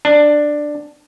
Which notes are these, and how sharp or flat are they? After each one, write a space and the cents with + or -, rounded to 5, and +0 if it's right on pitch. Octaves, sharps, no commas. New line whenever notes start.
D4 +10